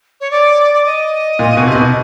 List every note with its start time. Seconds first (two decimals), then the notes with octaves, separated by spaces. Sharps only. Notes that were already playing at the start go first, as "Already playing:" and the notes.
0.20 C#5
0.31 D5
0.73 D5
0.85 D#5
1.39 A#2
1.57 B2
1.67 C3
1.75 B2